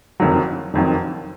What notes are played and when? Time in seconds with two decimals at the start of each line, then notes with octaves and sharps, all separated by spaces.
0.20 F#1 F2 D#3 F#3
0.74 F#1 F2 D#3 F#3